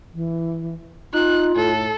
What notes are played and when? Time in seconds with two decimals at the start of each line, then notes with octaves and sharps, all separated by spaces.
0.14 E3
1.14 D#4 F4 F#6
1.56 A2 A4